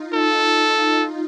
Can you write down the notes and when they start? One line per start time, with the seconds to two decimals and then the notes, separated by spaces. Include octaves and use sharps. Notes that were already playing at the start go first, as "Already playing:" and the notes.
Already playing: D#4 F4
0.13 A4